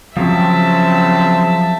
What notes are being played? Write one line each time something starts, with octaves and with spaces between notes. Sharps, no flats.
C#3 F3 F#3 C4 E5 A5